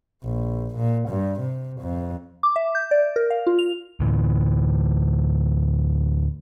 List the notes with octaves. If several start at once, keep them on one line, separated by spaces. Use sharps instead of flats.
A#1
A#2
G2
C3
F2
D6
E5
G6
D5
A#4
F5
F4
F7
D2 A2 E3